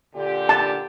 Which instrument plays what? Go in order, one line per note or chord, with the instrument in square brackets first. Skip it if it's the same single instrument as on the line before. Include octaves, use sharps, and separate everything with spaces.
[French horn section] A#2 D3 G4
[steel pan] A5